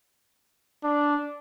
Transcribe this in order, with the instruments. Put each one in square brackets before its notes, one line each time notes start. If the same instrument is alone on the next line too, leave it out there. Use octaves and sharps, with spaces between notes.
[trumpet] D4